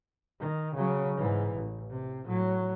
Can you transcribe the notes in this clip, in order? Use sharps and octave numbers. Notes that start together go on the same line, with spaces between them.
D#3
C#3 F#3
G#2 E3
A1
C3
A2 F#3